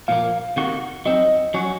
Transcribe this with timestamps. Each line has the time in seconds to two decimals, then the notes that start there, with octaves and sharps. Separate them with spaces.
0.08 A#2 F3 A#3 F5
0.56 C3 D#3 A#3 D#4 F#4
1.06 F#3 C4 D#4 D#5
1.54 F#3 C#4 F#4